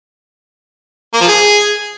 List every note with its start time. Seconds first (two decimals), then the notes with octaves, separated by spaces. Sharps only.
1.14 A#3
1.21 F3
1.28 G#4